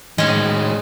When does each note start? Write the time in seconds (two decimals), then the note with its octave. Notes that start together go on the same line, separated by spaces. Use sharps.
0.18 A2 D#3 G#3 C#4